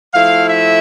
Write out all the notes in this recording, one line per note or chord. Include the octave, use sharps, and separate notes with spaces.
F3 A3 E4 F5
E5